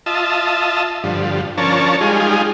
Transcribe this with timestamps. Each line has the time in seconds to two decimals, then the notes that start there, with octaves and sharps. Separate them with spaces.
0.06 F4 D#5 E5 A5
1.03 G2 D3 F3
1.58 F3 C#4 D4 A#4 C#5 A5
2.01 G3 G#3 D#4 F4 G#4